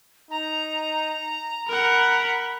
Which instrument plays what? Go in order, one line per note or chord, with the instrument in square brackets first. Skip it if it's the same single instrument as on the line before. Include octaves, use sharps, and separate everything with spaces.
[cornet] D#4 [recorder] A#5
[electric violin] A#4 F#5 [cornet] B5